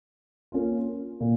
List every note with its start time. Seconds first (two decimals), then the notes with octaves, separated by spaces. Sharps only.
0.52 A#3 C#4 F4
1.20 A#2